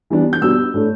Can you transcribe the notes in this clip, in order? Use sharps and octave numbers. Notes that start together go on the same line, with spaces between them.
E3 G3 B3 D4
G6
B2 G3 B3 D4 E6
A2 A3 D4